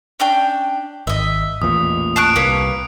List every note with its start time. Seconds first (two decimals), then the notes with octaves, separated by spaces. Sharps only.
0.20 C#4 D4 G5
1.07 G#1 D#5 E5
1.62 A1 E2 A#2 D#6
2.16 A5 C#6 F#6 C7 D7
2.36 C2 A#3 B4 C#5